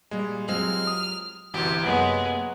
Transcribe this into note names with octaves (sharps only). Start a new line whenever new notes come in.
A#2 G3 G#3
F#3 G#3 C4 F4 G4 F6
D#6
G1 C2 E3 F#4 G4
F#2 C3 F#3 G#3 A#3 B3 F#5